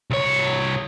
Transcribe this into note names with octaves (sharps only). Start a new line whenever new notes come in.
C2 C#5